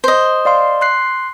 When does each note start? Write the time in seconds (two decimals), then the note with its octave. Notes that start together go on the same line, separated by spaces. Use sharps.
0.04 C5 D#5
0.45 D5 F5 C6
0.81 C6 F#6 C7